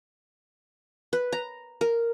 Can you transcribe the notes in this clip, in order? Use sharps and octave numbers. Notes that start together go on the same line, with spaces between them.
B4
A#5
A#4